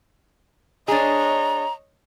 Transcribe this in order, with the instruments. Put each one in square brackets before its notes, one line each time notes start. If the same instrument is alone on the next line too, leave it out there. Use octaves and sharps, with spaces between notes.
[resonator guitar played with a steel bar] D4 G#4 [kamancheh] C#5 D#5 [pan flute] A#5